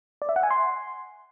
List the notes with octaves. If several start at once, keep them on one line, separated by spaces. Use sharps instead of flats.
D5
E5
F#5
G#5
C6